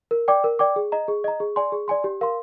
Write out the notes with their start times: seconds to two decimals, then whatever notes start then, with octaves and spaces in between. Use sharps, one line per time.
0.11 A#4
0.28 D5 G5 D6
0.44 A#4
0.59 D5 G5 D6
0.76 G#4
0.92 D#5 A#5
1.08 G#4
1.24 D#5 A#5
1.40 G#4
1.56 D5 G#5 C6
1.72 G#4
1.88 D5 G#5 C6
2.04 G4
2.21 A#4 F5 C6